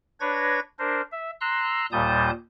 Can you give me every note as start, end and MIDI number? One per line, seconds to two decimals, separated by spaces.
0.20 0.60 62
0.20 0.60 71
0.20 0.60 73
0.20 0.60 92
0.20 0.60 94
0.79 1.01 62
0.79 1.01 70
0.79 1.01 72
1.12 1.31 76
1.41 1.86 82
1.41 1.86 84
1.41 1.86 88
1.41 1.86 90
1.92 2.30 39
1.92 2.30 46
1.92 2.30 55
1.92 2.30 81
1.92 2.30 87
1.92 2.30 91